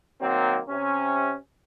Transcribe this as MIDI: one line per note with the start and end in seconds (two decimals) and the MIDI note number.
0.20 0.59 51
0.20 0.59 54
0.20 0.59 58
0.20 0.59 60
0.68 1.34 48
0.68 1.34 61